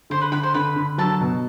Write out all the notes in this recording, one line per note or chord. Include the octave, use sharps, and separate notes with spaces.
D3 C5 C6
B4 B5
D3 B4 B5
C5 C6
D3 B4 B5
D3
F#3 A4 A5
B2